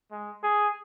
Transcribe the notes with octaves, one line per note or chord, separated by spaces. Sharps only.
G#3
G#4